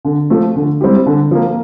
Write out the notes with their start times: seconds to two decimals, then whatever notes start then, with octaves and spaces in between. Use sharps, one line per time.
0.05 D3
0.30 F3 A3
0.56 D3
0.81 G3 C4 E4 G4
1.06 D3
1.31 F3 A#3